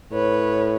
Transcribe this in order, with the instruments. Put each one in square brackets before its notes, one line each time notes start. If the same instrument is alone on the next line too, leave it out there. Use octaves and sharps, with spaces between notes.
[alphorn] A2 [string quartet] B4 C#5